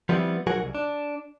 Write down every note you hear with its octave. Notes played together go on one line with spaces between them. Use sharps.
F3 G3 B3 C4 E4
B1 F#3 F#4 G#4 A#4 F#5
C2
D4